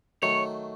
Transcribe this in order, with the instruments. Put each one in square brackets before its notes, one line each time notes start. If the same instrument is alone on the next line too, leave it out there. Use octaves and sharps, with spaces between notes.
[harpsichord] D#3 F#3 A3 [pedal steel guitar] C#5